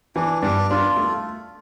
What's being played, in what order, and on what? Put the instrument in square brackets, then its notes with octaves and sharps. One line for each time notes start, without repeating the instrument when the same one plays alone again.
[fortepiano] E3 [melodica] D4
[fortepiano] G2 [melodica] D4
[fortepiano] D4 [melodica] F4
[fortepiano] A3